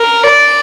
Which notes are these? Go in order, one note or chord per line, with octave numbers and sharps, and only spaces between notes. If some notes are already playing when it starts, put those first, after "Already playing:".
Already playing: A#4
D5